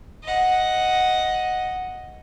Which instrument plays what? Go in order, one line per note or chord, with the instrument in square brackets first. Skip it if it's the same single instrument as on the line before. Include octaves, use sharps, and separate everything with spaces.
[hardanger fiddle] D#5 F#5